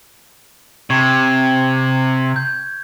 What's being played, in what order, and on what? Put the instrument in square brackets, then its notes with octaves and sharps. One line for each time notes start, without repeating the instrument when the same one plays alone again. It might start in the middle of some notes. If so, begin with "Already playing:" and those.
[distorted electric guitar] C3 [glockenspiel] C#6 G#6
[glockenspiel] G6